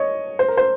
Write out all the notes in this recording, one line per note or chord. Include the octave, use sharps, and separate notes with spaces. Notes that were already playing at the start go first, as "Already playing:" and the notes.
Already playing: C#5 D#5
C5
A#4
C5